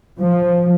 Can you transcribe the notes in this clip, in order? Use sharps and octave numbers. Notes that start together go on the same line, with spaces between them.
F3